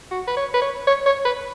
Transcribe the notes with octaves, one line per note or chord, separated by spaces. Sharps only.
F#4
B4
C#5
B4
C#5
C#5
C#5
B4